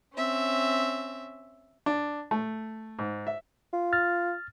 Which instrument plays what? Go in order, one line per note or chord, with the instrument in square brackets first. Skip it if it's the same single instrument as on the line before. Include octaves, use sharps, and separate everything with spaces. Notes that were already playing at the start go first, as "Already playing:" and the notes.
[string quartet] C4 C#4 E5
[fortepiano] D4
A3
G#2
E5
[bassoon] F4
[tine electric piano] F6 A6